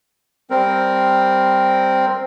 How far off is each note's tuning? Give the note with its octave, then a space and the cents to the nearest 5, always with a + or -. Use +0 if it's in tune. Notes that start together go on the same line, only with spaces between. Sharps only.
G3 +0 C4 +0 A#4 +0